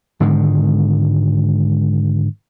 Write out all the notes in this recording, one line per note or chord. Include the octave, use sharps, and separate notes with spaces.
G#2 D3 D#3 G#3